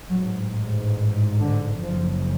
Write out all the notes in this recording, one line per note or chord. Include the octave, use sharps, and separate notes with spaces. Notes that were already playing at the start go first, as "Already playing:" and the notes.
A1 G#2 F#3
D3
F#1 F2 C#3 F3